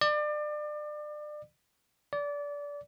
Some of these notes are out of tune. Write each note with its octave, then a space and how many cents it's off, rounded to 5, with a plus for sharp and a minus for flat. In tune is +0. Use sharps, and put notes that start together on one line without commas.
D5 +30
D5 -25